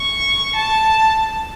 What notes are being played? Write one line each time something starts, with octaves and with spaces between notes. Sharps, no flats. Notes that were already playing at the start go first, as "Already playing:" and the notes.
Already playing: C#6
A5